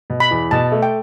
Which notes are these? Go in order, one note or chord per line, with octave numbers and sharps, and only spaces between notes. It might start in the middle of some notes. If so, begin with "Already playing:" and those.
B2
B5
E2
B2 A5
A3
G5